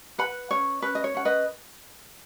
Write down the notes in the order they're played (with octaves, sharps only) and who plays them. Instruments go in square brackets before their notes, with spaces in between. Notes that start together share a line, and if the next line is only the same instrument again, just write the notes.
[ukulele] B4 F#5 B5
C#4 C#5
C#4 B4
D#5
C#5
C#4 F#5
B4 D#5